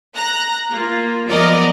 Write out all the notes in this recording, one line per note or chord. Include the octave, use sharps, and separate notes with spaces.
A#5 F#6 A#6
A#3 F4
F3 F#3 B3 A#4 D5 D#5